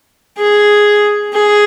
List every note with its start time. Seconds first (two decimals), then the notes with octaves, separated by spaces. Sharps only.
0.38 G#4
1.34 G#4